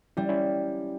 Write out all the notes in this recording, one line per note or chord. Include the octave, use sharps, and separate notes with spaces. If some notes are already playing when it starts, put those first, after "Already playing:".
G3 C#4 E4
C#4 E4